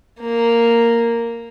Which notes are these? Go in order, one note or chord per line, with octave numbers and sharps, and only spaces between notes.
A#3